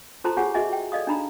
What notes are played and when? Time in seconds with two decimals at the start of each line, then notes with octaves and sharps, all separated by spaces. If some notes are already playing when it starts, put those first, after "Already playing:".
0.24 F4 A4 C5 A5 A#5 C6
0.37 F4 G4 G#4 C#5 F#5 G#5
0.54 F#4 G#4 D#5 E5 G#5
0.73 G5
0.92 A4 D5 D#5 F5 D#6
1.07 D4 D#4 A#5 B5